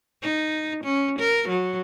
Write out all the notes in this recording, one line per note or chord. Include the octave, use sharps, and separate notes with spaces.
D#4
C#4
A#4
F#3